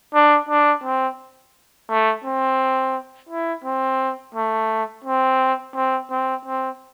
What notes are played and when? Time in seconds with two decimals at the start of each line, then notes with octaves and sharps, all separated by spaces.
0.14 D4
0.49 D4
0.83 C4
1.89 A3
2.24 C4
3.29 E4
3.64 C4
4.34 A3
5.04 C4
5.75 C4
6.11 C4
6.45 C4